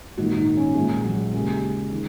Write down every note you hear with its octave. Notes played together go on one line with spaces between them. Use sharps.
A#1 G#2 D#3 F#4
D#4
C#4
A#1 A#2 G#3
F#3
D#2 C#3 G#3
D#3